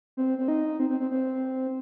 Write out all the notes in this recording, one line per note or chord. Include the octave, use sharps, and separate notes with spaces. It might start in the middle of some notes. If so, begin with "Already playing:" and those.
C4
C4
D#4
C4
C4
C4
C4